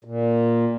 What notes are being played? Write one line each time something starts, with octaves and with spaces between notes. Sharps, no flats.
A#2